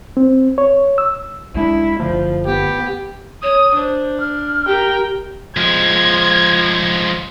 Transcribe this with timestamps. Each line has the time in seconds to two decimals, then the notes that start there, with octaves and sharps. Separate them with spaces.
0.17 C4
0.58 C#5
0.98 E6
1.55 B1 G#3 D4 E4
2.00 F#1 D3 F3 A3
2.47 B3 G4
3.43 C#5 D#6
3.76 D4 C5
4.20 F6
4.67 G4 A#4 G5
5.57 F3 G#3 G#6